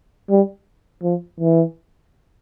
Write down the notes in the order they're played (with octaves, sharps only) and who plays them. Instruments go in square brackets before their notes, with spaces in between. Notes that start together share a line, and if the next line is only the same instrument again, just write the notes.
[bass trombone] G3
F3
E3